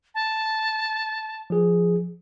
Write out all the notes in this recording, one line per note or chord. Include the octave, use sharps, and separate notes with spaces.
A5
F3 G#4